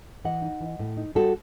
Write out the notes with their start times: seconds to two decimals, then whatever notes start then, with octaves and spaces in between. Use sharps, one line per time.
0.24 E3 D#5 F#5
0.42 D#4
0.61 E3
0.79 A2
0.97 D#4
1.15 G3 F#4 A4